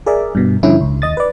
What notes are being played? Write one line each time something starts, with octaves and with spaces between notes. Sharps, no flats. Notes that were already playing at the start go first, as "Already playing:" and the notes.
G#4 A#4 D5 E5
G2 B2
G2 D3 F3 C#4 E4
C#2
D#2 D#5 D#6 A6
B4 D5